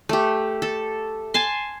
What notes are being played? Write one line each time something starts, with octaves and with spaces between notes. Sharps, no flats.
A3 G4
A4
G#5 A5 C6